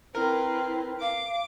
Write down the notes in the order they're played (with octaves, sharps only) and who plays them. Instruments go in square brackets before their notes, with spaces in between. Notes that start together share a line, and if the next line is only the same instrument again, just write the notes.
[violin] C4 B4 [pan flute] E4 [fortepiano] A#4
[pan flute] F5 [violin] D6